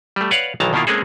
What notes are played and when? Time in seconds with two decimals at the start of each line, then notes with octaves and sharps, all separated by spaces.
0.16 G3 A3
0.31 B4 C#5 D5 F5 F#5
0.60 B1 D#3 E3 A5 A#5
0.73 B2 D#3 A#3 E4 F4
0.87 G#3 A#3 C4 C#4 G#4 A4